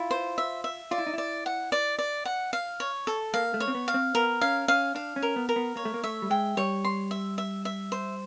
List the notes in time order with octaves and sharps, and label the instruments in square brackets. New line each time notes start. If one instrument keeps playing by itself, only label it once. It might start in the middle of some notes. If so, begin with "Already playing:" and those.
Already playing: [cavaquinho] E4 [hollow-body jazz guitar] F4
[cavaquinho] C5
E5
E5
[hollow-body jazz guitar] F4 [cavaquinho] D5
[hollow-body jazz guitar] E4
D#4
[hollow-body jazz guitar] E4 [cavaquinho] D5
[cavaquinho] F#5
D5
D5
F#5
F5
C#5
A4
[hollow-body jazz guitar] A#3 [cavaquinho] F5
[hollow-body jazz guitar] A3
[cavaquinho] C#5
[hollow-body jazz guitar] C4
B3
[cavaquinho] F5
[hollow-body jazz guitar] C4
[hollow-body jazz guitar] B3 [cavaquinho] A#4
[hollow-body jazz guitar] C#4 [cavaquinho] F5
[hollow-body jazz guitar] C#4 [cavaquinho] F5
[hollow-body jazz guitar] D4 [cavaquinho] F5
[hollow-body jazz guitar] C#4
[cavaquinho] A#4
[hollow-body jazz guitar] B3
[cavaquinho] A#4
[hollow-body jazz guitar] B3
[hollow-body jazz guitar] A#3 [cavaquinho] C#5
[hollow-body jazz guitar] A3
A#3
[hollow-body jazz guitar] A3 [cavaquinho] E5
[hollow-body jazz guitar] G3
[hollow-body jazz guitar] G#3 [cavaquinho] G5
[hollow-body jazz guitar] G3 [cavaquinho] C#5
[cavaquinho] C6
E5
E5
E5
C5